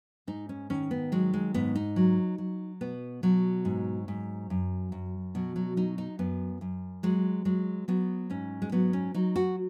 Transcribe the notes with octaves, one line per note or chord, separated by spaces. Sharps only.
G#2 D#4
C#4
D#3 C#4
B3
F#3 G#3
G#3
G#2 B3
D#4
F#3
F#3
B2 B3
B2 F#3
G#2
G#2
F#2
F#2
B2 F#3
F#3
F#3 D#4
D#4
F#2 B3
F#2
F#3 G#3
F#3 G#3
F#3 B3
G#2 C#4
G#3
F#3 B3
C#4
F#3 D#4
F#4